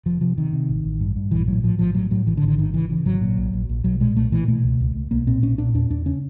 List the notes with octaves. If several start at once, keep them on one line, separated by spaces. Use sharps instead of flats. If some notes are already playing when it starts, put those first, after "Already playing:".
F1 F3
C3 F3
C3 D#3
C3
A1
A1
G2
G2
A#1 E3
A2 F#3
A2 F3
A#1 F3
A2 F#3
A2 F#3
A1 E3
D3
A1
D3
G#1 D#3
C#3 E3
C#3 E3
G#1 F#3
A#2
A#1
A#1
A#1
B1 F#3
A#2 G#3
B1 A3
A#2 E3
B2 A3
C#2
C#2
C#2
B1 A#3
A#2 C4
B1 C#4
A#2 D4
E2 D4
E2 D4
C#3 C#4